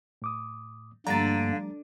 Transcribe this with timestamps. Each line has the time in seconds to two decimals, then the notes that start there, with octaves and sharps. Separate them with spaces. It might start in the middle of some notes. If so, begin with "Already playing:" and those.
0.22 A2 D6 D#6
1.07 G2 D3 F3 G3 A3 A#3 A#5 A6